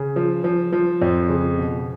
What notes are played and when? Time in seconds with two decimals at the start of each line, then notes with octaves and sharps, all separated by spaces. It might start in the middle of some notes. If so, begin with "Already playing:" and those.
Already playing: C#3
0.16 F3
0.44 F3
0.73 F3
1.02 F2
1.30 C#3
1.58 B2